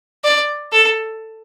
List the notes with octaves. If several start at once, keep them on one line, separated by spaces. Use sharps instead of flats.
D5
A4